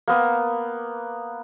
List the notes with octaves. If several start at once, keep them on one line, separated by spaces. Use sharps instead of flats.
A#3 B3